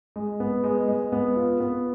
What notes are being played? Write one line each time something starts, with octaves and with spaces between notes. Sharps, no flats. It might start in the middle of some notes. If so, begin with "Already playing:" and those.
G#3
B3
G#3
G#3
B3
F4
B3